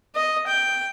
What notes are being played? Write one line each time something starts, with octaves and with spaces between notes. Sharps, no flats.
D#5
G5